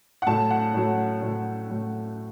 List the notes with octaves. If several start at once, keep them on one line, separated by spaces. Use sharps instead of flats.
F#5
A2 F#3 A3 A5
F#5
A2 F#3 A3
A2 F#3 A3
A2 F#3 A3